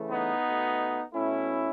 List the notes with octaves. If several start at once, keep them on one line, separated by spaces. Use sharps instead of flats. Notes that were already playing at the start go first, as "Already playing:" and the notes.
Already playing: C#3 E3 A3
B3 D#4
B2 A3
B2 A3 C#4 E4